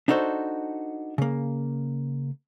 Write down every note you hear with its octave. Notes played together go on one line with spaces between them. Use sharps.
D4 D#4 F#4 A4 C5
C#3 A#3